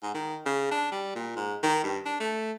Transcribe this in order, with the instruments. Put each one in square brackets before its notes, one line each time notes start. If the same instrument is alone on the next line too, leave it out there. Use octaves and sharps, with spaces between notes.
[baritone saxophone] G#2
D#3
C#3
D4
G3
A#2
G#2
D#3
G2
D4
A3